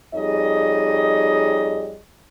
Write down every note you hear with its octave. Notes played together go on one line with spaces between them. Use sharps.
F2 G3 D#4 G#4 C#5 D#5